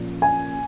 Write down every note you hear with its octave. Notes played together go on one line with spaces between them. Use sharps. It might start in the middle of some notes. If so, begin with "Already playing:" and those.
Already playing: A#2 F3 A#3 C#4
G#5